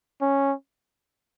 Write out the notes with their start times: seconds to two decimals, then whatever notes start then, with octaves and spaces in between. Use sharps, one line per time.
0.21 C#4